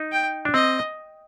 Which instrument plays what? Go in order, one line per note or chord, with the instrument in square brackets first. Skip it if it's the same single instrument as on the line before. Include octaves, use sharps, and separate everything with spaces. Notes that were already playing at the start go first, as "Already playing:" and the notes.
Already playing: [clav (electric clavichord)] D#4
[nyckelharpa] G5
[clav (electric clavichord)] D4
[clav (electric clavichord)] C4 [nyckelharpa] D#5